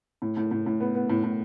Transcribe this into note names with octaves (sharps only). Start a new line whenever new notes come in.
A2
A2
A2
A2
B3
B3
A2
A2